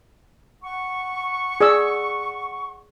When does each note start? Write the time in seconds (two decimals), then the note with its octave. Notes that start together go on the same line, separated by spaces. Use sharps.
0.63 F#5 C#6
1.61 G#4 D5 E6